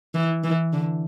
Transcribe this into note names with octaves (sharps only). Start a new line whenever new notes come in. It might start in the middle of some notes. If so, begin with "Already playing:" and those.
E3
E3
D3